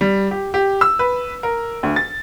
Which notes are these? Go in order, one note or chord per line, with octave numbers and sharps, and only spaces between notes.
G3
G4
G4
E6
B4
A#4
D2
A6